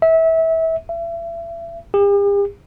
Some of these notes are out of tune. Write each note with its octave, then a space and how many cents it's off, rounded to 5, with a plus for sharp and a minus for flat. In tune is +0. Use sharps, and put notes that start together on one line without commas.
E5 -25
E5 +35
G4 +45